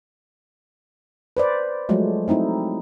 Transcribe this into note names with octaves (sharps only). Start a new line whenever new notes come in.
B4 C5 D5
F3 F#3 G#3 A3
A3 C4 D#4 E4